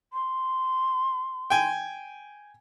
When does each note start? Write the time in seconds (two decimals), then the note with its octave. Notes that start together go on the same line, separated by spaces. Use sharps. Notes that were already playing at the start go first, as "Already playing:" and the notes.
0.13 C6
1.50 G5 G#5